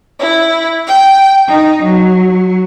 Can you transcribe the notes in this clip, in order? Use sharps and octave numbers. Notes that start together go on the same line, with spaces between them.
E4
G5
D#4
F#3